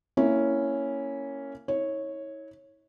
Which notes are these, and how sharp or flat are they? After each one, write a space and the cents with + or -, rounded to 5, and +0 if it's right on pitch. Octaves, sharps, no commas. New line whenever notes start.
A#3 -15 C#4 +0 E4 +0
E4 -45 C#5 -10